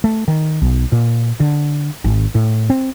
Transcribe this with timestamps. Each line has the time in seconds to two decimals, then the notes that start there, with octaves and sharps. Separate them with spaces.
0.04 A3
0.28 D#3
0.62 B1
0.92 A#2
1.40 D3
2.04 G#1
2.35 A2
2.70 C4